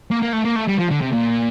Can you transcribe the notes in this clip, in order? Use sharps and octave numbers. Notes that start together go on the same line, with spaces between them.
A#3
A#3
A3
A#3
A3
G3
F3
D3
C3
A#2